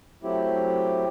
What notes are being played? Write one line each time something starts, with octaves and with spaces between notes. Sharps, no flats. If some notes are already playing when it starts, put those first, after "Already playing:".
F#3 A3 C4 E4 G4